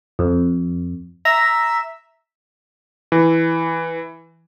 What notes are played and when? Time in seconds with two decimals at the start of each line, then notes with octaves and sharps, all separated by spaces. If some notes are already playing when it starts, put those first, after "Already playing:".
0.19 F2
1.25 E5 A#5
3.12 E3